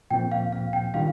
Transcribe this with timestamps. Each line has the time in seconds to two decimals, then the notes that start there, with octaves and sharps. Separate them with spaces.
0.10 A#2 F3 C4 G5
0.32 F5
0.52 F5
0.73 G5
0.94 D#3 G3 D4 F4 F5